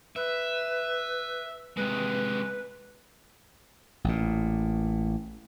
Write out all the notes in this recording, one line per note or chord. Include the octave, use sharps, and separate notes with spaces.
B4 E5
C3 G#3 B4
A1 A#2